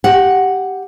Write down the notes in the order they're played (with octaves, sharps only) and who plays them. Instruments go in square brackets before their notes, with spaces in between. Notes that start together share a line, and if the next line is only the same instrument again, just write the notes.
[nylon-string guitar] G4 F#5